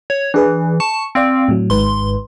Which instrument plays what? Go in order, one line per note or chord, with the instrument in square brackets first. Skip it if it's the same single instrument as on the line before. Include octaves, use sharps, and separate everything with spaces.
[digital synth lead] C#5
[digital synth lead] E3 [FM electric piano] D4 G#4 B4
[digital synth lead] A5 [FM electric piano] C#6
[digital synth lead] C4 [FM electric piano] D5 F5 C6
[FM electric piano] A2 F#3
[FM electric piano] G#1 G#2 B4 [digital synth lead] C6